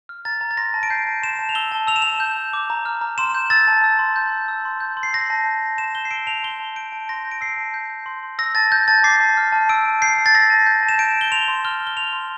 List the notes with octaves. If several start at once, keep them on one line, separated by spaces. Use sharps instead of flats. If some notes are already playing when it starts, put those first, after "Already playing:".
F6
A#5 A6
A#5
A6
C6 A#6
A5
D7
G6 C7
A5
C6 E7
A5
F7
E6 G7
A5
E6 F7
E7
A5 F7
G6
A5
D6
A#5
F6
A#5
C6 E7
G6
E6 A6
A5
E6
C6
G6
C6
E6
C6
G6
C6
C7
E6 A#6
A5
G6
A5
C6 E7
G6 G7
C7
E6 D7
A5 F7
C6 G7
A5
G6 D7
A5
C6 A#6
G6
D7
E6 C7
A5
G6
G6
C6
C6
E6 A#6
A5 A6
G6
A5 A6
D6 C7
A5
F6
A5
E6 D7
A5
G6 C7
A5
A6
E6 A#6
A5
G6
A5
E7
G6 D7
G6
G7
C6 F7
C6
F6 G7
F6
G7
C6 F7
C6